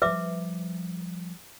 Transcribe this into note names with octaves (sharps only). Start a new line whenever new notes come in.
F3 G3 B4 E5 D6